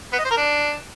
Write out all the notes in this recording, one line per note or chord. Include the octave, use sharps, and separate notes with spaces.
B3
D#5
C5
A#4
D4